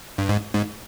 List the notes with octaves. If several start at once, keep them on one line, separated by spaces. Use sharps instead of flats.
G2
G#2
G#2